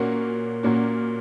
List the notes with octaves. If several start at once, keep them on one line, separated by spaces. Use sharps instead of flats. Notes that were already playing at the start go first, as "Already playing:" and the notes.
Already playing: A#2 A#3 C#4 F#4 A#4
A#2 A#3 C#4 F#4